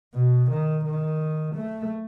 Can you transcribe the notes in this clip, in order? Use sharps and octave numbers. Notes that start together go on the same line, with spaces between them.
B2
D#3
D#3
A3